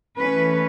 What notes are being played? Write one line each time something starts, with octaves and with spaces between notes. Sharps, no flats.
E3 A3 C#4 B4